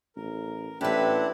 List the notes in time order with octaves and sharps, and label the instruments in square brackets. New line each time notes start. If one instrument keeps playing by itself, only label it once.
[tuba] A1 [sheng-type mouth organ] A#4
[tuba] A1 [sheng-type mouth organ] C4 F#5 A5 [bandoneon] D4 E4 [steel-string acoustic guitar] G4 B4